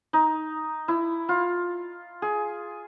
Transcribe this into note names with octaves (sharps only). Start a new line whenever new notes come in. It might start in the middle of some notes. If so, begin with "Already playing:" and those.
D#4
E4
F4
G#4